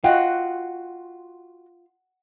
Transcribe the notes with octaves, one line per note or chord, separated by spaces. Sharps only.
F4 F#4 D#5 F#5 G5